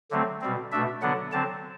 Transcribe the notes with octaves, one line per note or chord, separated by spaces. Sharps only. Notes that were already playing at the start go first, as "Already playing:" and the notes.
D3 F#3 A3 C4
B2 G3 C4
B2 A3 D4 E5
D3 F#3 B3 D4 F#5
D3 F#3 C4 A5